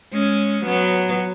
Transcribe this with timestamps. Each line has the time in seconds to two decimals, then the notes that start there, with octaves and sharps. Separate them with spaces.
0.12 G#3 C#4
0.65 F#3 B3